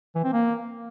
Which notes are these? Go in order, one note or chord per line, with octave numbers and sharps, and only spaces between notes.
E3
C4
A#3